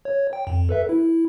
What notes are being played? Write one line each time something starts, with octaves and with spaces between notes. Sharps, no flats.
C#5
G5
F2
A4 B4 E5
E4